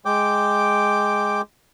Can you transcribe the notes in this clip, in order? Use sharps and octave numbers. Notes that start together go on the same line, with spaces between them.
G#3 G5 D6